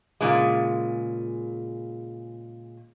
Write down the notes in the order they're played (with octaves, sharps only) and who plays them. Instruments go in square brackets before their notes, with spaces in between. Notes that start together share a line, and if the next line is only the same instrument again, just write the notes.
[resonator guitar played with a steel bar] A#2 C#3 G#3